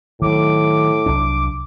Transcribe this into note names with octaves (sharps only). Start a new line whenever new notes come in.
A2 D#3 F#3 D6
C2 F#3 D4